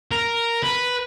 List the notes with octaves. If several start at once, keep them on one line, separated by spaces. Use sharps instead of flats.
A#4
B4